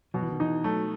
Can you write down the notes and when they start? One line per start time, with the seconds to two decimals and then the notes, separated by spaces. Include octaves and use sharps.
0.14 B2 F#3
0.23 E3
0.32 D#3
0.40 E3 D#4
0.64 F#3 A3